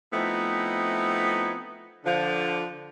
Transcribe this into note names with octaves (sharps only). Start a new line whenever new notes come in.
F3 A3 B3 C4 D#4 E4
D3 F3 D4